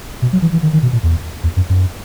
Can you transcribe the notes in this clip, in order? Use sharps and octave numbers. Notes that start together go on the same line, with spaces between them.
B2
F#3
E3
E3
D#3
D#3
B2
A#2
E2
E2
F#2
F#2